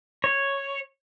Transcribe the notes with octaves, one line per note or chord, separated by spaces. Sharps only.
C#5